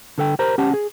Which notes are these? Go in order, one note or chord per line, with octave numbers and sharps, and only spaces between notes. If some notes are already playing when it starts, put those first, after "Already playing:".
D3 A4 G5
G4 A#4 C5 A#5
C#4 G4 F#5 A5
G#4